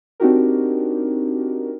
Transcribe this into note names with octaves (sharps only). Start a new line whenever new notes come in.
C4 D4 D#4 F#4 G4 A#4